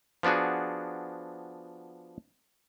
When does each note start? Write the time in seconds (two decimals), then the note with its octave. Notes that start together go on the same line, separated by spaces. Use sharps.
0.23 F3 B3 D4 F#4 G#4